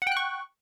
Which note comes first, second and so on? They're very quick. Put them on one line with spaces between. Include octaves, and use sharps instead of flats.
F#5 G5 F#6 C#6